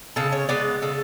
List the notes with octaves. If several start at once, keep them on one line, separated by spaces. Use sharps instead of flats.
C#3 A4
C#5
G#3 B3 D5
C#3 A4